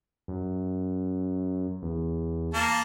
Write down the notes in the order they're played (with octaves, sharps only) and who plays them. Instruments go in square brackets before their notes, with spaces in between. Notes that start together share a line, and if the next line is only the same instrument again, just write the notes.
[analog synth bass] F#2
E2
[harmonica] A#3 A5